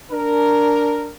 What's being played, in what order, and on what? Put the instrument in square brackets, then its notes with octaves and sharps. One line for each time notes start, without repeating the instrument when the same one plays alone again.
[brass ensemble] D4 A#4